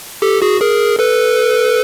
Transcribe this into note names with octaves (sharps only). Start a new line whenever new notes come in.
G4 A4
F#4 G#4
G#4 A#4
A4 B4